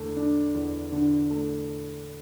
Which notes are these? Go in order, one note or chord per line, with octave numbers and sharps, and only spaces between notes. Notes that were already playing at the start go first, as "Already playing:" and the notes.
Already playing: E2 D3 A3
D4
E2
D3
A3